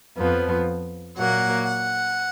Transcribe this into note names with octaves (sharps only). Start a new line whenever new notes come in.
F2 F3 B3
A#2 F#3 A#3 F#5
F#5